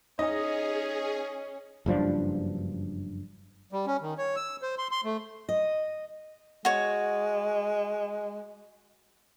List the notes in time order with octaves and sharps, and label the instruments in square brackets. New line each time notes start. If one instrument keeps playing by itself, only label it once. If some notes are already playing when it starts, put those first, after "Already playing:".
[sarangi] C#4 [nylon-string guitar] D#4 [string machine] G#4 [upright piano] D#5
[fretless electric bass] F#1 G2 F3 D4
[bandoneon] G3
C#4
D#3
C#5
E6
C5
C6
C6
A3
[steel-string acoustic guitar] D#5
[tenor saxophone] G#3 [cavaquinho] F#4 C#5